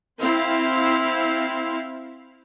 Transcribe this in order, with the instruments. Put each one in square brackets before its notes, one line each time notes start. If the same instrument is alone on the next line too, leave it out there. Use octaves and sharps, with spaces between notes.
[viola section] C4 E4 F5 C6